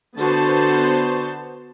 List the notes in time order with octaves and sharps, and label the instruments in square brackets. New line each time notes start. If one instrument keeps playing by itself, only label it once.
[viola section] D3 B3 F#4 C5 A5